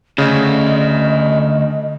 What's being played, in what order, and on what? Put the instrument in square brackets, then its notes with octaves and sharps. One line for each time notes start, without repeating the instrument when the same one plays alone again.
[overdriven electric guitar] D2 [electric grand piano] C#3 [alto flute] D#5